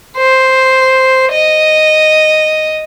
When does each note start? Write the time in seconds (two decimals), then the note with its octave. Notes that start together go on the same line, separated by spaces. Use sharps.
0.17 C5
1.32 D#5